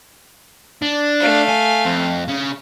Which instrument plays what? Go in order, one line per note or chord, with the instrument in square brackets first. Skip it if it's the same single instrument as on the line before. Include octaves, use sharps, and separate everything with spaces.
[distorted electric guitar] D4
[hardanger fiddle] A3 F5
[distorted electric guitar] G#5
F2
C#3